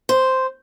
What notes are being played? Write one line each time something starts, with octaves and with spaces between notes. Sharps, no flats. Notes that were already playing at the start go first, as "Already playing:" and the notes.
C5